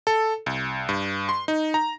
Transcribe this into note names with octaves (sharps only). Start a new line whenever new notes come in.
A4
C2
G2
C6
D#4
A#5